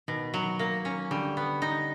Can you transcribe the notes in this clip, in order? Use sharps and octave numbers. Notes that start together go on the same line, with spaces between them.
B2 D#3
F#3
A#3
C#4
D3 G3
B3
D#4